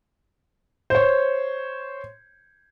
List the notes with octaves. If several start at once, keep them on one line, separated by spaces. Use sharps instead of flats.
C5 C#5